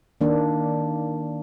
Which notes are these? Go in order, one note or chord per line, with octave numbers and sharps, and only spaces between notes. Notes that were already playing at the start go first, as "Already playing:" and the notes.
D#3 A#3 D4